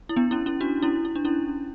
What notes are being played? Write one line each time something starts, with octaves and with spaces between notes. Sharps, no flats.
E4
B3 D4
C#4 E4
C#4 E4
D4 F#4
C#4 E4
E4
D4
C#4 E4